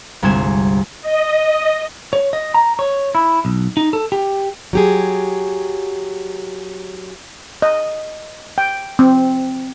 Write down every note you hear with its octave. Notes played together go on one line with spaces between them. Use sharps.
G1 C2 G#3 C6 G#6 E7
D#5
C#5
D#5
A#5
C#5
E4
B1
D#4
A4
G4
F#3 G4 G#4
D#5
G5
C4